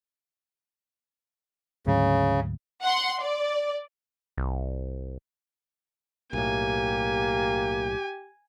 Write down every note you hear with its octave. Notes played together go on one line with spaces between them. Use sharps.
D2 G#2 C#3 F#3
F#5 C6
D5
C2
B1 A2 A#3 G4 G#5